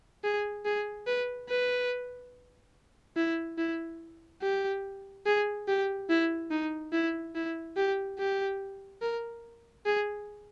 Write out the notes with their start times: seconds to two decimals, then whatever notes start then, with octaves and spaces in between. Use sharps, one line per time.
0.24 G#4
0.65 G#4
1.07 B4
1.49 B4
3.17 E4
3.58 E4
4.42 G4
5.26 G#4
5.68 G4
6.09 E4
6.51 D#4
6.93 E4
7.35 E4
7.77 G4
8.19 G4
9.02 A#4
9.86 G#4